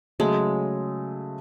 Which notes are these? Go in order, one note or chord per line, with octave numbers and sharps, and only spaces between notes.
C#3 F#3 G#3 A3